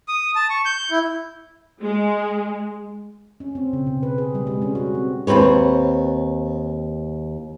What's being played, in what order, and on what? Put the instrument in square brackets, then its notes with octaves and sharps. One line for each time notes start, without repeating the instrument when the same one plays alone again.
[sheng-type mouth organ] D#6
A5
C#6
G6
E4
[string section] G#3
[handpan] C#4
C4
C#3
B2
B4
G#4
G3
G#3
C#4
F#4
C4
[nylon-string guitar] D#2 G#2 C4 B4 C#5